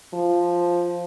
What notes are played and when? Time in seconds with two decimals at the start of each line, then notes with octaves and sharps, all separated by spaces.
0.14 F3